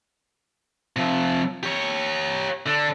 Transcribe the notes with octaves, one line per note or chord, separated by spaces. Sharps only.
C3 F3
G4 C#5
D3 D4